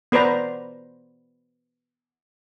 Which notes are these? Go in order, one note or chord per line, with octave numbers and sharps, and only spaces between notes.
B3 B4 C5 D5 A#5